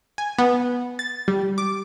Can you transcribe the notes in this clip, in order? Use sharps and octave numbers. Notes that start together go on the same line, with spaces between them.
G#5
B3
A6
G3
D6